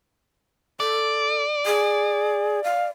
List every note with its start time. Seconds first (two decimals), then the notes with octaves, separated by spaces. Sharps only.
0.80 A4 D5
1.66 G#4
2.64 F5